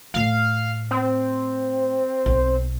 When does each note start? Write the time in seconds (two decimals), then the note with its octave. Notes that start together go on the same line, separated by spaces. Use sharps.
0.14 A2 A3 F5
0.91 C4
2.26 B1